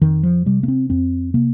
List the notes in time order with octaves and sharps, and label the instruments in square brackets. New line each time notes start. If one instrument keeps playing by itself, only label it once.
[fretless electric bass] F2 D#3
F3
C3 G3
A#3
C4
F2 C4
C3 A#3